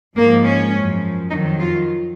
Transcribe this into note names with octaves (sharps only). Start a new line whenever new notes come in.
G#2 F3 A#3
C#4
F#2 F3
F2 D#3 F#3 D#4
F4